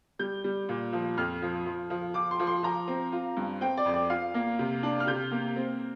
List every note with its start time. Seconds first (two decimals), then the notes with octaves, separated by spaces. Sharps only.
0.19 G3 G6
0.44 G3
0.69 A#2
0.93 F3
1.17 F2 F6
1.42 F3
1.66 F3
1.90 F3
2.14 F3 D6
2.31 C6
2.40 F3
2.47 C6
2.63 F3 A#5
2.88 C4
3.12 F4
3.37 G2
3.61 C4 G5
3.77 D5
3.85 F2
3.94 D5
4.10 F4 F5
4.34 A#3
4.59 C3
4.83 D4
5.00 F6
5.07 C3 G6
5.32 A#3
5.56 C4